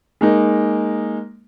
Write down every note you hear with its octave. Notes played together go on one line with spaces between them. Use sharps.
G#3 A#3 D#4